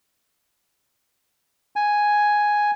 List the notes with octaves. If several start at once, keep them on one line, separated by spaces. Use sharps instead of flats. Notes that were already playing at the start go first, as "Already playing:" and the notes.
G#5